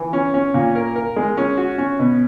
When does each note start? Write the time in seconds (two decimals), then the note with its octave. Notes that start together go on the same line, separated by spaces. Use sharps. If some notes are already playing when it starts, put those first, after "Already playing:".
Already playing: E3
0.13 C#4
0.34 C#4
0.54 A#2
0.75 A#4
0.96 A#4
1.16 G#3
1.37 C#4
1.57 F#4
1.78 C#4
1.99 B2